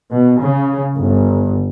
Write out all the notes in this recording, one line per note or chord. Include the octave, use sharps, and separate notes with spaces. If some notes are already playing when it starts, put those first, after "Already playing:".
B2
C#3
G1